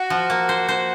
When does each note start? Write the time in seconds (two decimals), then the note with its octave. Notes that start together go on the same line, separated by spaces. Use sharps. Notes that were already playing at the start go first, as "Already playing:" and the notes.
Already playing: F#4
0.10 F3
0.30 A#3
0.49 C5
0.69 C5